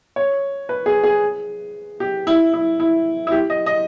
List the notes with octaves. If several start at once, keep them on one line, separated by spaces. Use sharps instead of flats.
C#5
B4
G#4
G#4
G4
E4
E4
E4
E4
G4
D#5
D#5